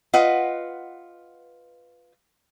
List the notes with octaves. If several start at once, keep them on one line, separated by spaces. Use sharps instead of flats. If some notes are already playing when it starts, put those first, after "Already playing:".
F4 B4 D#5 F#5